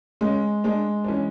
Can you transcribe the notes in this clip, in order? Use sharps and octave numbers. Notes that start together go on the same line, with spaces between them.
G#3 C#4
G#3 D4
D4
E3 C#4